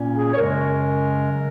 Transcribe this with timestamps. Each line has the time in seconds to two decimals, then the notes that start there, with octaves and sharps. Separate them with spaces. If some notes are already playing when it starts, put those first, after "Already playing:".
Already playing: A#2 A#3 C#4
0.15 G#4
0.34 C#5
0.37 F#2 C#3 G#3 C#4 A#4
1.30 C#3 F#3